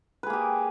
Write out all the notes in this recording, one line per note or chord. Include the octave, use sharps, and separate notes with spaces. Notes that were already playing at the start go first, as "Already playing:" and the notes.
A#3 G4 G#4 B4